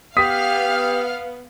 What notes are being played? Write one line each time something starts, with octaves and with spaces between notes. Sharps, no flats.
B3 G4 F5 D#6 F6 B6